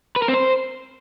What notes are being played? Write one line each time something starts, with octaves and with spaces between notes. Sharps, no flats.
B4
A#4
C4
C5